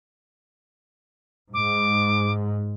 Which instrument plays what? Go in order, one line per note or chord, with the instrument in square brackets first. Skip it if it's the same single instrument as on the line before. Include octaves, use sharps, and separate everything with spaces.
[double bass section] G#2 [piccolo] D6